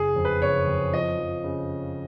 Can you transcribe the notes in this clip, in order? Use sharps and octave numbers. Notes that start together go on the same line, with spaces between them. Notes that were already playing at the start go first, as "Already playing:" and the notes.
Already playing: F#1 G#4
F2
B4
F#1 C#5
F2
F3 D#5
F3
C#3